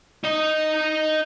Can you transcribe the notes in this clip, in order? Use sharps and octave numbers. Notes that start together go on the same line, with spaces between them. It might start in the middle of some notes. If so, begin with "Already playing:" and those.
D#4 D#5